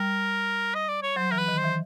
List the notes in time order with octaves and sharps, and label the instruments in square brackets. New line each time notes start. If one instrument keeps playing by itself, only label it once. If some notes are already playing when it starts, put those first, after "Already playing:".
Already playing: [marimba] G3 [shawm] A#4
[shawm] D#5
D5
C#5
[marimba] F#3 [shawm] C5
[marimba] E3 [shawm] A#4
[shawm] B4
[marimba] D#3
[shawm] C5
[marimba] E3